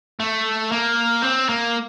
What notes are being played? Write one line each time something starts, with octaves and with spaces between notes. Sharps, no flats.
A3
A#3
C4
A#3